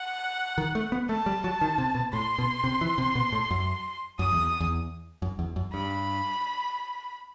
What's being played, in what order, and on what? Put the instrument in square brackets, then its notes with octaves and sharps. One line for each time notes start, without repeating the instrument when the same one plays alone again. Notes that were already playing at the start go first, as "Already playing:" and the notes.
Already playing: [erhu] F#5
[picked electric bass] D#3
A3
B3
[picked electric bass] A3 [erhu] A5
[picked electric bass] G3
F#3
D#3
C3
B2
[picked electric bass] A2 [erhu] C6
[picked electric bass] B2
C3
E3
C3
B2
A2
F#2
[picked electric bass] F#2 [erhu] D#6
[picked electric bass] E2
E2
F#2
E2
F#2
[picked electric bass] G2 [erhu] B5